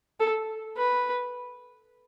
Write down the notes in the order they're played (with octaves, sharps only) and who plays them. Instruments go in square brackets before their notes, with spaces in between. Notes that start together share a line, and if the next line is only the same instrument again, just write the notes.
[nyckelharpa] A4
B4